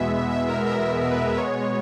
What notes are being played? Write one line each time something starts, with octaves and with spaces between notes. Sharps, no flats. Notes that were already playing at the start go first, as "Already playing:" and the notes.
Already playing: E2 B2 G#3 B3 E5
E5
A#4
A#4
A#4
B4
B2 G#3 B3 C#5